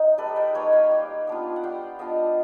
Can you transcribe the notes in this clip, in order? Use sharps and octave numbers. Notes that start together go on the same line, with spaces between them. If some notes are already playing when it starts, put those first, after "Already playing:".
Already playing: D#4
G3 A4 B4
A#4 C5
A#3 D#4 B4 C#5
F5 G5
G3
B3 D4 F4
F#5
G3 F5 G5
B3 D4 F4 D#5 F5